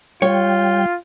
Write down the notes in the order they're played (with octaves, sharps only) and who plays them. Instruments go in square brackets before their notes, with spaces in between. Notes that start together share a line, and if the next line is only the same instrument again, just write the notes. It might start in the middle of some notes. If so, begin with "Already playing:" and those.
[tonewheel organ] G3 G5 G6 [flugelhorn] F4 [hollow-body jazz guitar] C#5